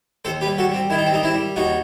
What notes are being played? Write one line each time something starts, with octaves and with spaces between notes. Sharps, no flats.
D#2 A4 C5
G4 B4
G3
F#4 A4
G3 C4
D#3 E4
D#4
C4
G3 D#4
C4 E4
G3
D#2 D#4 F#4